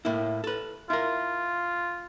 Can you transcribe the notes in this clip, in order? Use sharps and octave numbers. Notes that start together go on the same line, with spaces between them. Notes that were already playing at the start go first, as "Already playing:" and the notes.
A2 A#3 E4
A4 B4
E4 F4 A#4